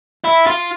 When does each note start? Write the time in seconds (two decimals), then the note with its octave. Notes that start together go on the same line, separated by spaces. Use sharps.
0.24 E4
0.46 F4